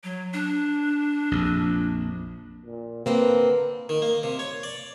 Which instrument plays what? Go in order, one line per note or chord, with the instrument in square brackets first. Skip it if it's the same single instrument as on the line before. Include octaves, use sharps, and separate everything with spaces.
[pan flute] F#3
D4
[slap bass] A#1 F2
[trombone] A#2
[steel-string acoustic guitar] D3 A#3 C4 [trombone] B4
[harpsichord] D#3
A#3
C3
C#5
D5